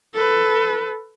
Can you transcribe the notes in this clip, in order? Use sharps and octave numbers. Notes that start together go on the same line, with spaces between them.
A4 B4